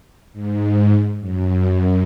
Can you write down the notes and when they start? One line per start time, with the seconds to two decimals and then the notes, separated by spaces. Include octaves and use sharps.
0.33 G#2
1.20 F#2